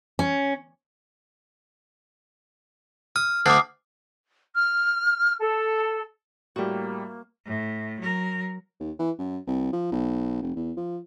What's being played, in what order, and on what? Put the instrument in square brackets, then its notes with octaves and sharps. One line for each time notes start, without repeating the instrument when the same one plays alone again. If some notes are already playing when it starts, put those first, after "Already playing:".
[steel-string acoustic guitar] C#4
[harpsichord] D#6 [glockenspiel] F6
[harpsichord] D2 D3 [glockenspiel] D6 D#6 C7
[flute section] F6
A4
[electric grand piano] A2 G3 [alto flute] A#3 [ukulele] F#4 G4
[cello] A2
F#3 A#4
[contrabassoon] D#2
E3
F#2
C2
F3
B1
F1
E2
F3